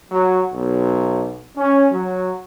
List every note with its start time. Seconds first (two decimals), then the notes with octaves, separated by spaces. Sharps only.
0.12 F#3
0.53 B1
1.57 C#4
1.92 F#3